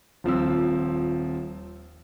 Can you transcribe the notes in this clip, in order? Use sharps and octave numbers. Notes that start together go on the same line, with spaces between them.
D#1 F3 C4 E6